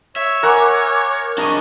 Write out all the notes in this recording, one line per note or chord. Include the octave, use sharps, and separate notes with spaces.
C#5 E5
A#4 F#5 G#5 C#6 D6
D4 G#4 D#5 A#5 C#6